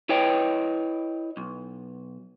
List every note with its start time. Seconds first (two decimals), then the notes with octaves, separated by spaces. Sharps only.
0.09 E4 B4 C#5 D#5 G5
1.37 B1